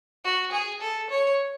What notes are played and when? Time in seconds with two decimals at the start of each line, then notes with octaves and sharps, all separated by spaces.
0.24 F#4
0.52 G#4
0.81 A4
1.10 C#5